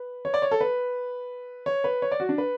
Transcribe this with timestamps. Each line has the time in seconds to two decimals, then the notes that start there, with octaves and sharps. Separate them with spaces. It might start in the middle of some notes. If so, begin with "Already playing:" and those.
Already playing: B4
0.25 C#5
0.34 D5
0.42 C#5
0.51 A4
0.61 B4
1.66 C#5
1.84 B4
2.02 C#5
2.11 D5
2.20 F#4
2.29 D4
2.38 B4